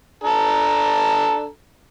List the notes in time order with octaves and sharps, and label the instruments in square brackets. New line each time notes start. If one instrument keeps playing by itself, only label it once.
[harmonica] D4 A4 A#5